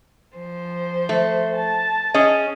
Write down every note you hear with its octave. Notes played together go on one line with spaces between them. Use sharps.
F3 C5
A3
A5
C#4 G#4 D#5